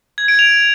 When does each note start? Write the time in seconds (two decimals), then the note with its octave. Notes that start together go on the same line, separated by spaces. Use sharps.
0.18 G#6
0.28 D7
0.39 F7